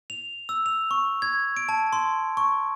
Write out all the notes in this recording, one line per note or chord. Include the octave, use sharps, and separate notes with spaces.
F7
E6
F7
C#6
G#6
D7
A5
C6
C#6